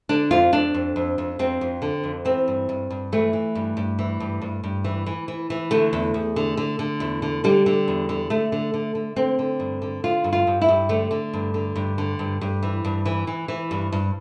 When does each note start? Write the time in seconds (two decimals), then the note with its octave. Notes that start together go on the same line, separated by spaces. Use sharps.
0.09 D3 D4
0.31 F2 F4
0.52 F2 D4
0.74 F2
0.96 F2
1.18 F2
1.39 F2 C4
1.61 F2
1.82 D3
2.04 F2
2.25 E3 C4
2.48 G2
2.69 G2
2.90 G2
3.12 E3 A3
3.33 E3
3.55 G2
3.77 G2
3.99 E3
4.20 G2
4.42 G2
4.64 G2
4.84 E3
5.06 E3
5.28 E3
5.50 E3
5.71 D3 A3
5.93 E2
6.14 E2
6.36 D3
6.57 D3
6.79 D3
7.00 E2
7.22 D3
7.44 D3 G3
7.66 D3
7.88 E2
8.09 D3
8.30 D3 A3
8.52 D3
8.74 D3
8.95 D3
9.16 D3 C4
9.39 D3
9.60 G2
9.82 D3
10.04 D3 F4
10.24 G2
10.33 F4
10.47 G2
10.61 E4
10.69 G2
10.89 D3 A3
11.11 D3
11.34 G2
11.54 D3
11.76 G2
11.98 D3
12.19 G2
12.41 G2
12.63 E3
12.85 G2
13.05 E3
13.27 E3
13.48 E3
13.71 G2
13.92 G2